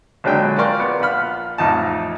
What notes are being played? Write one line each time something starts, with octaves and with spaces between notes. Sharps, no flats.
A#1 D3 F#3 G#3 D4 G5
F4 A#4 D5 C6 C#6 F6
B3
A#1 F4 F#5 B5 F6
A1 F2 D#4 A5